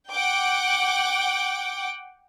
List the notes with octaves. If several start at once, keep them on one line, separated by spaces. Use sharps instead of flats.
F#5 G5 D6